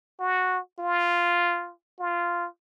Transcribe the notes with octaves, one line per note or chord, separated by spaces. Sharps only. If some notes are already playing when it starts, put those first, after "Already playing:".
F#4
F4
F4